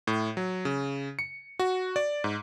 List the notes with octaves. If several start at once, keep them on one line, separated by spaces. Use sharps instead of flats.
A2
F#3
C#3
C#7
F#4
D5
G#2